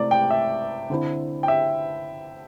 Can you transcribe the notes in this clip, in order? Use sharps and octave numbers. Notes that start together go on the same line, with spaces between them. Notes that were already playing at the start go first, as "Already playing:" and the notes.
Already playing: C3 A3 E4 D5
G5
E5
D3 C4 E4
G5
E5